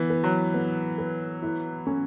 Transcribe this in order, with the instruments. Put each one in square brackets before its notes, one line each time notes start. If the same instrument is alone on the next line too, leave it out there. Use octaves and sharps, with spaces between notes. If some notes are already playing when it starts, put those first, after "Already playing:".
Already playing: [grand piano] E3 B3
[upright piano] B4
[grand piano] F#3
[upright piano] B3
B4
E4
C#4